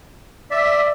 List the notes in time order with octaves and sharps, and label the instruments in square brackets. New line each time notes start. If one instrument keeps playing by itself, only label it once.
[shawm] D5 [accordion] E5